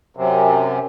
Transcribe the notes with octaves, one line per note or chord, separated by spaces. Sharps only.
F#2 C3